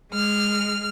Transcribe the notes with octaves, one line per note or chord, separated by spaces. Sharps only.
G#3 F6